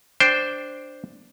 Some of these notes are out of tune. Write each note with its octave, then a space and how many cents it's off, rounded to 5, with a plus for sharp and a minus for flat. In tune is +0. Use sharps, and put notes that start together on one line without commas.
D4 +0 C5 +0 G5 +0